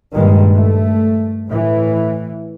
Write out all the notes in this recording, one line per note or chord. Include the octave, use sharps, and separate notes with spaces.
G2 A#2 D#3 G3 G#3
A3
A2 E3